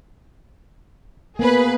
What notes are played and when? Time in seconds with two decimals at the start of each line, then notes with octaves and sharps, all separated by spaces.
1.39 A#3 B3 G#4 B4